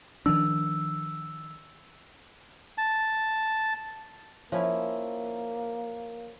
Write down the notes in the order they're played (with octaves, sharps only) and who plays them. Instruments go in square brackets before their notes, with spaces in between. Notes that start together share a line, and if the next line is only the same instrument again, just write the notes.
[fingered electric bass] D#3 F3 D4 [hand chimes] E6
[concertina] A5
[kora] F3 C#4 E4 [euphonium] A#3 [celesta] C#5